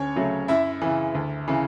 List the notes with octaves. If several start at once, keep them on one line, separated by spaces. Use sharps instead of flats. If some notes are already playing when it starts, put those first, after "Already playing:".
Already playing: D2 C#4 C#5
C#3 F#3 A3
F#2 E4 E5
C#3 E3
D2
C#3 E3